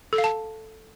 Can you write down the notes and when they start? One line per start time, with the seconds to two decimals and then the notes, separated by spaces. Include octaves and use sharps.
0.13 A4
0.18 F5
0.24 A5